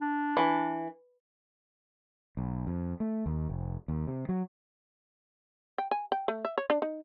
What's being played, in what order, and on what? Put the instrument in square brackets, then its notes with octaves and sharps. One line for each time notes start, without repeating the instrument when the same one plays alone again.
[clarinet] D4
[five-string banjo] E3
[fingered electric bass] B1
F2
A3
D#2
F1
D#2
C3
F#3
[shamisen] G5
G#5
G5
A3
E5
C#5
D4
D#4